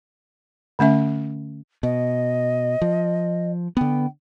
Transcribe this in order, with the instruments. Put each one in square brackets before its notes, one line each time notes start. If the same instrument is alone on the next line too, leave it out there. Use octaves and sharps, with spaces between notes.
[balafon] D3 A3 C#4 E5
[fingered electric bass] B2 [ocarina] D#5
[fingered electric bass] F3
[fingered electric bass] D3 B3 [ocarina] G5